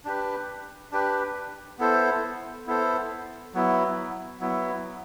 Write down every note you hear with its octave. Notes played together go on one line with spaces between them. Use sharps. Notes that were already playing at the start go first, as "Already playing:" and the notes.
D4 G4 B4
D4 G4 B4
B3 E4 A4 C5
B3 E4 A4 C5
F#3 B3 E4
F#3 B3 E4